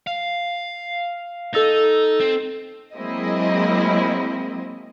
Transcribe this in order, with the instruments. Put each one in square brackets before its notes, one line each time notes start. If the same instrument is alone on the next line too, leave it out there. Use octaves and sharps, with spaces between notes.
[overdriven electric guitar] F5
[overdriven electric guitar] D#4 [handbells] A4 E6 A6
[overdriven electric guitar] C4
[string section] F#3 G#3 A#3 C4 E4 D#5